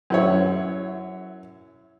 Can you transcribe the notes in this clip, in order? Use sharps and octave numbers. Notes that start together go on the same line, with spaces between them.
F#2 E4 C#5